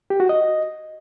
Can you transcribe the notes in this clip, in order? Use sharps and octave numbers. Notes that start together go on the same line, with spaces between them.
G4
F#4
D#5